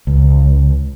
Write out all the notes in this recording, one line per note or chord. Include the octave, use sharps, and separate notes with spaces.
C#2